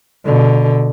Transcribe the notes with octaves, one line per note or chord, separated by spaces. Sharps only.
B2 D3